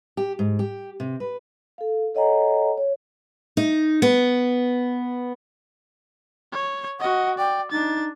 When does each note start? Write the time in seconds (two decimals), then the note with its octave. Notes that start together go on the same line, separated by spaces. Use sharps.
0.17 G4
0.39 G#2
0.59 G4
1.00 C3
1.20 B4
1.78 A4 F5
2.15 A4 C#5 D#5 F#5 G#5 A#5
2.77 C#5
3.57 D#4
4.02 B3
6.52 C#5
7.00 F#4 D#5 F#5
7.38 D5 G5
7.71 D4 D#4 A6